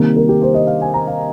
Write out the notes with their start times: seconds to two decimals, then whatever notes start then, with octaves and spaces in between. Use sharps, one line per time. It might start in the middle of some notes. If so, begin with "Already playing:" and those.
Already playing: C3 D#3 G3 A#3
0.16 A#4
0.29 G4
0.42 C5
0.54 D#5
0.67 F5
0.81 G#5
0.94 A#5
1.07 F5